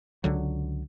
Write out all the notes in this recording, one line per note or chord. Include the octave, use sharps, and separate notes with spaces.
C#2 D3 F#3